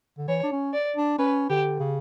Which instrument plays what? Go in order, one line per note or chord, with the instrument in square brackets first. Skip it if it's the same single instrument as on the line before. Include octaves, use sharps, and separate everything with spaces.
[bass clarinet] D3
[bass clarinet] E3 [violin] C#5
[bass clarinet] D4
C#4
[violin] D5
[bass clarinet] D4
[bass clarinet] C#4 [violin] B4
[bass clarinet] D3 [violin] G4
[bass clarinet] C#3